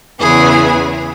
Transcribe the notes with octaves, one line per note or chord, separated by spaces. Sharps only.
E2 C#3 E3 B3 G#4